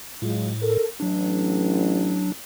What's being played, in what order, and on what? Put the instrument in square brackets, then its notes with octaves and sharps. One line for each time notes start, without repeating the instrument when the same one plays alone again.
[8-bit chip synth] A2 [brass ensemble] F#3 G#3 F4
[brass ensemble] A4 A#4
[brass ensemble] A1 [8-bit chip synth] F#3 D4